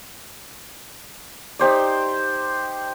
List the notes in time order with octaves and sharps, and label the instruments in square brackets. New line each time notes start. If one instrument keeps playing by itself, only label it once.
[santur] D#4 G4 C5 D5